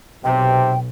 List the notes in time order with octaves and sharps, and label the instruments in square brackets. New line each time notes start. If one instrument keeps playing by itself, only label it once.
[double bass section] B1 [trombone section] C3 [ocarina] G5